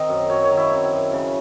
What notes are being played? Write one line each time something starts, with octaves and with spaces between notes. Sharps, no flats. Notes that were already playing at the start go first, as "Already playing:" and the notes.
Already playing: D#3 C4 D#5
F#2
F#2 C#5
C#5
D#3
E4
C4
F#2
C#3